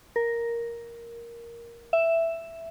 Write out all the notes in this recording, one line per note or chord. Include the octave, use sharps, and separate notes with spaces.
A#4
E5